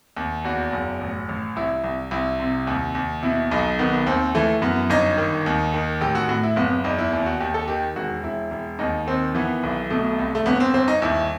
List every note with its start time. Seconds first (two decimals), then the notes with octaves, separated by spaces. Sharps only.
0.17 D#2
0.44 E2 F#4
0.73 F#1
1.01 A1
1.29 A1
1.56 C2 E4
1.84 C2
2.11 C2 E4
2.40 C3
2.67 D#2
2.95 D#2
3.23 B2 E4
3.51 B1 D#4
3.79 D#3 B3
4.07 D#2 C4
4.35 E3 A3
4.62 F#2 B3
4.90 G1 D#4
5.17 D#3
5.46 D#2
5.74 D#3
6.01 A1 G4
6.15 F#4
6.29 A2 F#4
6.43 E4
6.56 F#1 B3
6.71 B3
6.84 E2 D#4
6.98 E4
7.12 D#2 E4
7.26 F#4
7.40 D#2 G4
7.54 A4
7.68 D#3 G4
7.96 E1 F#4
8.24 E1 E4
8.51 E1
8.79 D#2 D#4
9.07 D#3 C4
9.35 E3 B3
9.63 B1
9.90 B2 A3
10.19 C2
10.35 A3
10.46 G1 B3
10.60 C4
10.74 G1 C4
10.88 D#4
11.02 D#2 E4